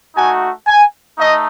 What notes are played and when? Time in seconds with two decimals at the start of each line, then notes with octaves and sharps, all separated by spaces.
0.16 A3 D#4 F#4 G#5
0.67 G#5
1.18 A3 D#4 D#5